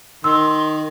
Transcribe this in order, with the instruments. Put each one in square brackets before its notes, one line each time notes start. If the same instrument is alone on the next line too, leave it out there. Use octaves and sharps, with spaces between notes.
[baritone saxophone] D#3 [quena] C6 [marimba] E6